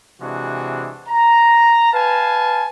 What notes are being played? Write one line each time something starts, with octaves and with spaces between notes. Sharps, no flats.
C3 E3 G#3 D4 F#4
A#5
B4 F5 G#5 A5